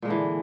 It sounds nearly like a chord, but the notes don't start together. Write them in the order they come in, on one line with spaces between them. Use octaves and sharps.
A#2 G#3 D3 E3